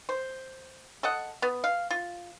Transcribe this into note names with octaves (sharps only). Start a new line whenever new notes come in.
C5
A4 D#5 F#5
B3
F5
F4